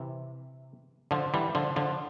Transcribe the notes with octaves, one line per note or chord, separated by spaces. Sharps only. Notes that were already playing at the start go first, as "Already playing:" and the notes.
Already playing: C3 E3
D3 F3
E3 G3
D3 F3
D3 F3